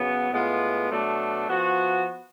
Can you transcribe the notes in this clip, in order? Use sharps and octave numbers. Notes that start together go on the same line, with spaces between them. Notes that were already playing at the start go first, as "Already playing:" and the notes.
Already playing: C#3 F#3 B3
A2 G#3 B3 F4
B2 F#3 A3 D4
F3 B3 F#4